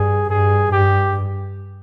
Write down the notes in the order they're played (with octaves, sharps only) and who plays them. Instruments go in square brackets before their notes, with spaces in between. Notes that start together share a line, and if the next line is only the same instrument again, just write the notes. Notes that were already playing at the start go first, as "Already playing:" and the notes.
Already playing: [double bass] G2 [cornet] G#4
[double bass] G2 [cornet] G#4
[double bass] G2 [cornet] G4